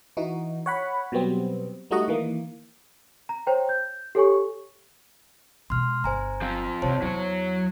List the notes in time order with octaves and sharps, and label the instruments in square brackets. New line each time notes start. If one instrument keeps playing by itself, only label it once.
[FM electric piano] E3 D#4 F#4
C#5 F#5 B5
B2 F#3 G3 B3 C4
G3 A3 D#4 F#4 D#5 F#5
D#3 E3 A#3
[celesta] A#5
C5 C#5 G5 A#5
G6
G4 A4 C#5 G#5 C#6
[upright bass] B2 G#3 [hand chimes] C6 F6
[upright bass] G1 [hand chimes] C5 G#5 A#5
[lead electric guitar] F3 C4
[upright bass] C3 E4 [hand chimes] C5 C#5 A5
[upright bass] E2 [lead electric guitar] F#3 C#5 [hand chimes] E4